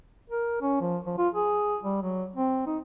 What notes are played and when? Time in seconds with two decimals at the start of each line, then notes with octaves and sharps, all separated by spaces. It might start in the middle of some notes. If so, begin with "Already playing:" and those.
0.30 A#4
0.61 C#4
0.81 F3
1.06 F3
1.18 F4
1.33 G#4
1.83 G3
2.02 F#3
2.36 C4
2.67 D#4